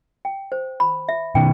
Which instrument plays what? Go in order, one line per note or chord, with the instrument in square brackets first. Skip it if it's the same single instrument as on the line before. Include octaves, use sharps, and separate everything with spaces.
[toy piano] G5
C5
B5
E5
[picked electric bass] B2 D#3 [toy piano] G5